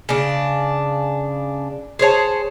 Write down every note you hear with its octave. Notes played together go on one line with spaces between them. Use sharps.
C#3 D4
G#4 C5 C#5 A5